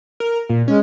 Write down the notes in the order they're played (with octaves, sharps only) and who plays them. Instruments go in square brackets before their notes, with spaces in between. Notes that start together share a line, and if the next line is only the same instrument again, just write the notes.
[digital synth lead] A#4
A#2
[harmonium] G#3 [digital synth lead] C#4